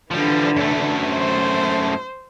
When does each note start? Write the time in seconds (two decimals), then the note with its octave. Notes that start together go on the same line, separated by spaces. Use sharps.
0.11 D3 E3 F3 G3
0.57 F#2 A3
1.12 C5